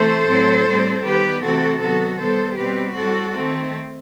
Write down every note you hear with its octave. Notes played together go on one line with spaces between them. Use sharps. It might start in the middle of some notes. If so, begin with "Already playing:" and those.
Already playing: C3 E3 A3 A4 C5
A2 F#3 C4
A2 G3 C4
D#3 G3 B3 G4 B4
C3 E3 A3 C4 F#4 A4
D#3 F#3 B3 F#4 A4
B2 G3 B3 A4 C5
B2 G3 C4 G4 B4
A2 G3 C4 F#4 A4
D#3 A3 C4